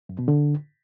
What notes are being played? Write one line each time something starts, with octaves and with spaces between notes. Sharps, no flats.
F#2
B2
D3